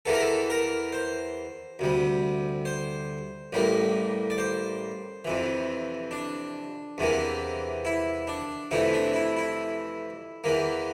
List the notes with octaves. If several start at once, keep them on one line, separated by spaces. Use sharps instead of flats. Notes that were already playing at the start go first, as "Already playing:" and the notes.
E2 E3 A#3 A4
A#4
A4
A#4
C5
D2 C3 G3
C5
A1 A2 G3 A#3
D5
C5
F2 C3 E3
D4
E2 C3 E3 A#3
E4
D4
F2 C3 E3 A3 E4
D4
E4
E4
E2 E3 A#3